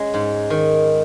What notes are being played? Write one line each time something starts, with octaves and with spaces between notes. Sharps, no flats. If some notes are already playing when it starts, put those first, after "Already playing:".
Already playing: G#3 C#4
G#2
D#3